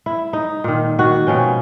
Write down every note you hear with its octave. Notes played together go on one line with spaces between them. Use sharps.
E4
D#4
A#2 D#3
D#3 F#4
B2 F3 C#4 G5